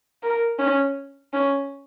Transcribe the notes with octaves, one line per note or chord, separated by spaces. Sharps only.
A#4
C#4
C#4